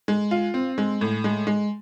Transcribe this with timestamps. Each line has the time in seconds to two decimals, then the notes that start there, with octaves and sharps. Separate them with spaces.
0.08 G#3
0.31 F4
0.54 C4
0.78 G#3
1.01 A2
1.24 G#3
1.47 G#3